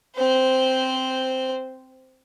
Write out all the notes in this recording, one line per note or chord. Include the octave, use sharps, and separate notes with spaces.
C4 C5